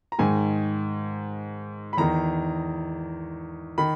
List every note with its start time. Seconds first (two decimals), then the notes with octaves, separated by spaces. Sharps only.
0.12 A#5
0.19 G#2 D#3 G#5
1.93 B5
1.97 E2 D#3 A#5
3.78 D#3 B5